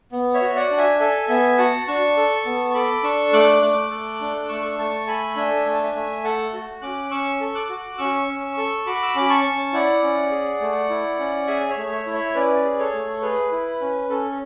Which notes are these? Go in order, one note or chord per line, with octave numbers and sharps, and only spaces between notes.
B3
C#5 E5
F#4
D5 F#5
D4
E5 G#5
A4 E5 G#5
B3 E5 G#5
F#4 F#5 A5
D4 A5 C#6
A4
B3
C#6
A4 B5 D6
D4 C#6 E6
A3 D6 F#6
A3 D6 F#6
A4
D4
A3 C#6 E6
A3 A5 C#6
A4 G#5 B5
D4 E5 G#5
A3 G#5
A5
E5 G#5
A3 E5 G#5
A4 F#5 A5
F#4
C#4 D6 F#6
C#4 C#6 E6
A4
D6 F#6
F#4
C#4 C#6 E6
C#4
A4
F#4 B5 D6
E6
C#4 D6
A5 C#6
C#4
E4 D5 F#5
C#4
G#4
A3
E4
C#4
G#4 E5 G#5
C#5 E5
A3
C#5 E5
E4
C#5 E5
C#4 B4 D5
G#4
A4 C#5
A3
G#4 B4
E4
C#4
C#4 A4